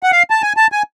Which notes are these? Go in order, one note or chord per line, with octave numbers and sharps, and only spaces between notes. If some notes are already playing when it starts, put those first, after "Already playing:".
F#5
F5
A5
G#5
A5
G#5